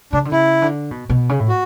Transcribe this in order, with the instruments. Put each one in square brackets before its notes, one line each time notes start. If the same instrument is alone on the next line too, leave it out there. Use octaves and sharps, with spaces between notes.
[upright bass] C#3 [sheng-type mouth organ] D4
[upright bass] D3
[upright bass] C#3 [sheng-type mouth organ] E4
[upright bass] D3
B2
B2
C#3
A2
[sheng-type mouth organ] F#4